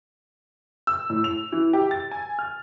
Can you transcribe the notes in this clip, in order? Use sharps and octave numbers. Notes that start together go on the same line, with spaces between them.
E6
A2
F7
E3
G4
A6
G#5
F6